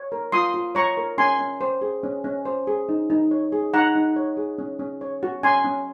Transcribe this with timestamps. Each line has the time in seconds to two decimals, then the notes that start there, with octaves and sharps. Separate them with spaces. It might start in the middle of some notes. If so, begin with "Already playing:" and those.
Already playing: C#5
0.12 A#4
0.32 F4 C6 D#6
0.54 F4
0.75 C#5 A#5 C#6
0.97 A#4
1.18 C#4 G#5 C6
1.39 C#4
1.61 C5
1.81 G#4
2.03 C#4
2.24 C#4
2.45 C5
2.67 G#4
2.89 D#4
3.10 D#4
3.31 C#5
3.52 G#4
3.74 D#4 F#5 A#5
3.95 D#4
4.16 C#5
4.37 G#4
4.58 C#4
4.79 C#4
5.01 C#5
5.23 F#4
5.43 C#4 G#5 C6
5.64 C#4